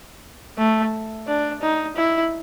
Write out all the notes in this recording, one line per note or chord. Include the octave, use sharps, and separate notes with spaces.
A3
D4
D#4
E4